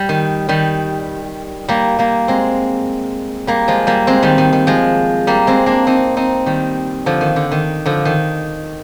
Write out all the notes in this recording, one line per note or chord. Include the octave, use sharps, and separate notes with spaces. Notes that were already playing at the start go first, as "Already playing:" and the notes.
Already playing: G3
D#3
D#3 G3
G3 A#3
G3 A#3
G#3 C4
G3 A#3
F3 G#3
G3 A#3
G#3 C4
D#3 G3
D#3
D#3
F3 G#3
G3 A#3
G#3 C4
A#3 D4
C4 D#4
C4 D#4
D#3 G3
D3 F3
D#3
D3
D#3
D3 F3
D#3